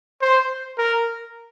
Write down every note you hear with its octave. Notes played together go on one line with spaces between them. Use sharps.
C5
A#4